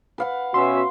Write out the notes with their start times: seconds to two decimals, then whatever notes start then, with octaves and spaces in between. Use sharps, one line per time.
0.18 B4 F5 F#5
0.54 B2 C#4 F#4 E5 C6